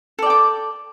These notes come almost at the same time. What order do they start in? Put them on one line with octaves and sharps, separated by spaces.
A4 D5 G5 D6